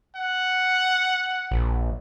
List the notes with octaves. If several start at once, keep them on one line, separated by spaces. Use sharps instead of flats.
F#5
A#1